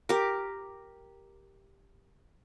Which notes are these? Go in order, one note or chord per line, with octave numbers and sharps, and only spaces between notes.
G4 A#4